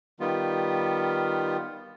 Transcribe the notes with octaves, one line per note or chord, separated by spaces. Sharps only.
D#3 G3 B3 F4